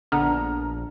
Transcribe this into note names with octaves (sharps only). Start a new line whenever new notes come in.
A#1 D3 B3 D4 A#5 F6